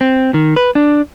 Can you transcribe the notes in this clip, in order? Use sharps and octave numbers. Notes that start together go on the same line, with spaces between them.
C4
D#3
B4
D4